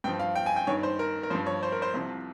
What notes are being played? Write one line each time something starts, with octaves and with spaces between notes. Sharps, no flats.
G2 F3 G5
F5
G5
G#5
G5
G2 D#3 C#5
C5
A#4
A#4
G2 F3 C5
C#5
C5
A#4
C5
C2 C3 F3